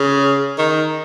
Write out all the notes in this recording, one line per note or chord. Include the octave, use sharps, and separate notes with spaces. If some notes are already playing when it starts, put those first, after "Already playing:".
Already playing: C#3
D#3